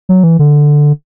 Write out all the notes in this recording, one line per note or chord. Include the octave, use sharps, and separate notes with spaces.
F#3
E3
D3